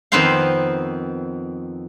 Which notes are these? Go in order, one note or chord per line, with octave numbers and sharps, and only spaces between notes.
F2 D#3 B3 C4 C5 F5